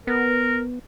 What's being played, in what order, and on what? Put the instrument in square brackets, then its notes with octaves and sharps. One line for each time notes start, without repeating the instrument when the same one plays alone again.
[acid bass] B3 [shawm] A#4